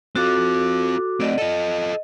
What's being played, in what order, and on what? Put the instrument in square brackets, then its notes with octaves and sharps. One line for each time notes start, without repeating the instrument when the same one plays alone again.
[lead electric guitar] C4 F4 [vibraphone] F#4 A4 D6
[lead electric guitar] A3 C4 [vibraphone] D5 D#5 F#5
[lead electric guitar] F4 A4 [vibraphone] D#5